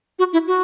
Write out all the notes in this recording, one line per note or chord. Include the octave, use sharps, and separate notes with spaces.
F#4
E4
F#4